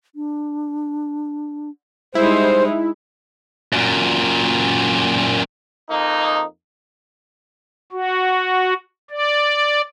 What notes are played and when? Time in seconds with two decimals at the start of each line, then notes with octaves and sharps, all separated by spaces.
0.15 D4
2.15 G3 G#3 D#4 E4 C5
3.73 F#2 A#2
5.91 F2 A#3 D#4
7.93 F#4
9.11 D5